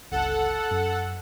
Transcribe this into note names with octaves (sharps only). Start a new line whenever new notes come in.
G1 C#2 A4 F#5
F#2